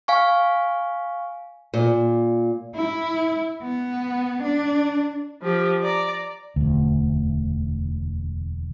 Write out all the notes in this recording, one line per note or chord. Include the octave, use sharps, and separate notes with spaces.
F5 G#5 C#6
A#2
E4
B3
D4
F3 G4
D5 A#5
E1 D2